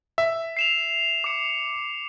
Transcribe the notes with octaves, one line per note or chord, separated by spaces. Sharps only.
E5
C7 E7 F7
D6 C#7